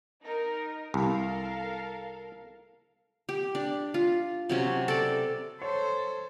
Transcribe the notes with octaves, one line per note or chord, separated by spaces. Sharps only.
D#4 A#4
C2 A4 A#4 F5
G4
D4
F4
C3 F#3 C#4
A4 D5
A4 C5 C#5